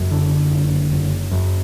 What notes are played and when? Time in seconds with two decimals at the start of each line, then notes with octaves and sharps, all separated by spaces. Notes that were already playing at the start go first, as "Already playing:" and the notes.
Already playing: F#1 F#2
0.11 D3
0.51 F#1
0.91 F#1
1.32 F#2